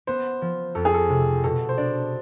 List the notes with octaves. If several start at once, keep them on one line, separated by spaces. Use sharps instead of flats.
B3 C5
F3
F2 A4
G#4
A4
C3
B2 A4
C5
D4 D5